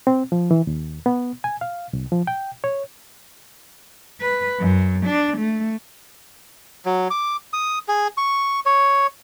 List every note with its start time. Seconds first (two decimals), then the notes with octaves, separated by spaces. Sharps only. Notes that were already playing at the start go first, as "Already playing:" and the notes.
0.07 C4
0.32 F3
0.51 E3
0.67 D#2
1.06 B3
1.44 G#5
1.61 F5
1.93 C2
2.12 F3
2.27 G5
2.64 C#5
4.21 B4
4.60 F#2
5.06 D4
5.38 A3
6.86 F#3
7.10 D6
7.53 D#6
7.88 G#4
8.17 C#6
8.66 C#5